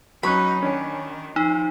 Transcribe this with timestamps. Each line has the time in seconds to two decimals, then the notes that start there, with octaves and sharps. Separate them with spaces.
0.23 F#3 C#4 D#4 B5 C#6 F#6
0.62 D#3 C#4 D4 G#5
1.36 F3 D#4 E6